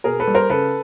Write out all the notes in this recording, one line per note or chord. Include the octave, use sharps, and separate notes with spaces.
B2 G#4 A#4
A4 B4
G3
A#4 C5
C#3 A4 B4